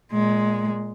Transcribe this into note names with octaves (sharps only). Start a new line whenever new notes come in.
A#2 G#3